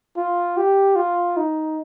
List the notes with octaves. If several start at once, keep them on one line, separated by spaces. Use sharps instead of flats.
F4
G4
F4
D#4